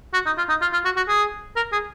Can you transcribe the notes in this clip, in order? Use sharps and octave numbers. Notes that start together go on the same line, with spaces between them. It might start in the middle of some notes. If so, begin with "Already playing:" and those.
F#4
D#4
F4
D#4
F4
F4
F#4
F#4
G#4
A#4
G#4